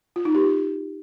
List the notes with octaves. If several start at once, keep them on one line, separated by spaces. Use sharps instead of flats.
F4
D#4
G4
F4